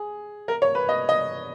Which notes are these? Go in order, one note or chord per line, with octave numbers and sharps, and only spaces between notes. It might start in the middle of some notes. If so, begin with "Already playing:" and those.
Already playing: G#4
A#4
C#5
B4
D#5
D#5